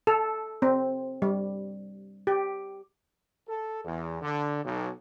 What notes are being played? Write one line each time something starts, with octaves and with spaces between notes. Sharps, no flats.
A4
C4
G3
G4
A4
E2
D3
B1